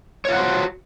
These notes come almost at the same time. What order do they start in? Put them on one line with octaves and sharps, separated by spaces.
C#5 F4 F#5 C5 F#4